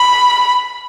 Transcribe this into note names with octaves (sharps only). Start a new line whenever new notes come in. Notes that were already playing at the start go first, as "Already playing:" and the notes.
Already playing: B5